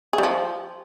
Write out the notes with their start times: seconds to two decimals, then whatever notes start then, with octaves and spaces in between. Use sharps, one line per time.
0.13 G#4
0.18 G3
0.23 F3